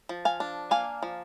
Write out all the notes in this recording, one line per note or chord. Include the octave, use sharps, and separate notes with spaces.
F3
F5 G#5
D4
A#3 F5 G#5
F3